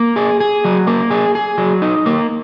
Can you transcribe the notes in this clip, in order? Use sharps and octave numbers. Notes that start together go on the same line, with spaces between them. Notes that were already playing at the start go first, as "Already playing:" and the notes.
Already playing: A#3
G#4
G#4
F#3
A#3
G#4
G#4
F#3
D#4
A#3